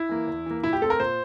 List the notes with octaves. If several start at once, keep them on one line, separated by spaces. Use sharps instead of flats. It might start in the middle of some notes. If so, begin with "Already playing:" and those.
Already playing: E4
E3 A#3
E2
E3 A#3
A#2 E4
G4
A3 C4 A4
A#4
A#2 C5